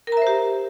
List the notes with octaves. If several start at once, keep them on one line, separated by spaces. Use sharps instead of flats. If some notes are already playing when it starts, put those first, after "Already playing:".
G4 A#4 C5 E5 A#5